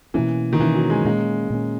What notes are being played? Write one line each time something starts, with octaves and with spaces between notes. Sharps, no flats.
B2 E3 A#3 C#4
D#3
B2 E3 A#3 C#4
F#3
G#3
A#2 G#3 A#3 C#4
A#2 A#3 C#4